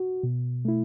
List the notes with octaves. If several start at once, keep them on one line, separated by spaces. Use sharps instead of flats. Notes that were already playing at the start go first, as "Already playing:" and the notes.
Already playing: F#4
B2
A3 E4